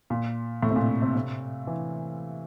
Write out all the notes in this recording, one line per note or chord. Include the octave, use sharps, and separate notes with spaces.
A#2
A2
C3
A#2
C3
C3
E3